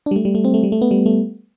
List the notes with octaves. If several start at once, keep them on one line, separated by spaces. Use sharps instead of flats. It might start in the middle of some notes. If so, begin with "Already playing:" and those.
D4
G3
A3
G3
A3
C4
A3
G3
A3
B3
G3
A3